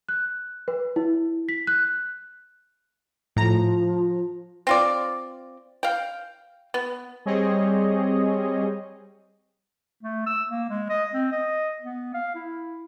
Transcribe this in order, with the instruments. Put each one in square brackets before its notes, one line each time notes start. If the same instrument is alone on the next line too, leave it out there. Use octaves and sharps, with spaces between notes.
[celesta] F#6
B4
E4
B6
F#6
[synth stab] A2 A#5 [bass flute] F3
[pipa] C4 F4 D5
F5 G5
B3
[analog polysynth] G3 C4 G#4 C#5 D#5
[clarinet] A3
E6
A#3
G#3
D#5
C4
D#5
B3
F5
E4